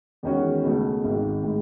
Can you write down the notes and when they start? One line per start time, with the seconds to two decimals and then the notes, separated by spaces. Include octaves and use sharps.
0.23 E2 D#3 G#3 C#4 F#4
0.63 C#2 B2 A3
1.04 G#1 G#2 D#3
1.43 A2 G#3